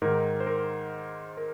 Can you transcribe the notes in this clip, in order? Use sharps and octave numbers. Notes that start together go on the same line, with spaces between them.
G#2 D#3 A#4
C5
A#4
A#4